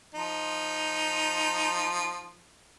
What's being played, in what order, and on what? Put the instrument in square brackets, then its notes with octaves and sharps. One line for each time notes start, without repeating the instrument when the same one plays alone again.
[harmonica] F3 D#4